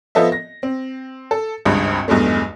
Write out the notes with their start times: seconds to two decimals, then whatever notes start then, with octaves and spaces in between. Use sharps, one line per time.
0.15 F3 B3 A4 D#5 E5
0.32 A#6
0.63 C4
1.31 A4
1.65 G#1 C#2 G2
2.08 B1 E2 G2 G#3 A3